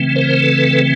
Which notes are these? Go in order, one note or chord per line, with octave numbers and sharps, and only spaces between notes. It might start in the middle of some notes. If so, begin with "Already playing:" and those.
Already playing: C#3 E3 A3 C4
A#4 C5
A4 B4